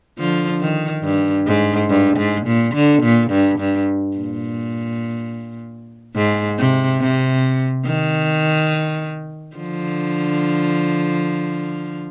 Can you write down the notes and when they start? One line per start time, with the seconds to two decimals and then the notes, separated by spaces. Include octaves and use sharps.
0.18 D3 F3
0.61 D#3
1.04 G2
1.47 G#2
1.89 G2
2.17 G#2
2.47 A#2
2.75 D3
3.03 A#2
3.31 G2
3.59 G2
4.17 A#2
6.16 G#2
6.59 C3
7.00 C3
7.85 D#3
9.56 D3 F3